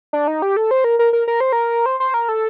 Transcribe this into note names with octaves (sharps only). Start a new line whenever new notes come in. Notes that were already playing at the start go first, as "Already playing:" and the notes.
D4
D#4
G4
A4
C5
A#4
A#4
A#4
A#4
C5
A#4
C5
C5
A#4
A4